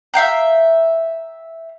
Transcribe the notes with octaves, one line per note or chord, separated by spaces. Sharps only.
E5 F5 G5 A#5